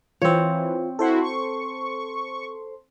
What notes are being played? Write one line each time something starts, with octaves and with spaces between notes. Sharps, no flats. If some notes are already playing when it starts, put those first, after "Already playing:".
E3 C4 F4 C5 C#5
E4 F#4 A4 C5 C6
C#6